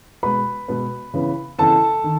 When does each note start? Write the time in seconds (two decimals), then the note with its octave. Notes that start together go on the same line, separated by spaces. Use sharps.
0.23 B2 G#3 B3 B4 B5
0.68 B2 G#3 B3
1.14 C#3 E3 B3
1.59 C#3 E3 B3 A4 A5
2.04 D#3